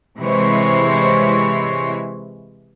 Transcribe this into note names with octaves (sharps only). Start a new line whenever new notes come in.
C3 E3 G#3 E4 C5 C#5